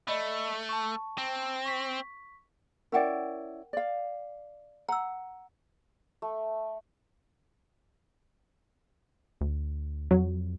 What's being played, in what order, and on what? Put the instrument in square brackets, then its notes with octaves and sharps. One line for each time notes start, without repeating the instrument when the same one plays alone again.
[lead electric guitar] A3 [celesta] D5 D#5 B5
[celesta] A5 C#6
[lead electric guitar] C4
[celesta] C#6 B6
[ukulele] C#4 E4 D5 [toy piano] A#4 F#5 G5
[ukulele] D5 F5
[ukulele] F#5 [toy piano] A#5 E6
[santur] A3
[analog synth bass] D2
[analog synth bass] F2 [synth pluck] F#3